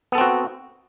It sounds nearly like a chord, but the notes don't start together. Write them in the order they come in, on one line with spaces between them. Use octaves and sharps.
B3 A4 C4 F#4